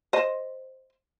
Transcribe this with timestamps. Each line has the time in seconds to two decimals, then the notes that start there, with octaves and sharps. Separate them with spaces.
0.13 C5 D#5